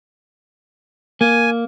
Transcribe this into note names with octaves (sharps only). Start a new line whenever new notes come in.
A#3 G#5